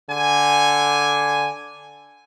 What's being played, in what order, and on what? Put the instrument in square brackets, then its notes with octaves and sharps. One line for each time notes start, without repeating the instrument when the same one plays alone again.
[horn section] D3 G#5